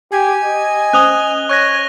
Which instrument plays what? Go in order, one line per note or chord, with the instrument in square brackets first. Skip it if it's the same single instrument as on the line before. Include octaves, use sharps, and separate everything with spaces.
[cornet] G4 [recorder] G#5
[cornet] D#5
[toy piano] C#4 C5 D#6 [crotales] F#6 F7 G7
[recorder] C#5 [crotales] C#6 F#6 A#6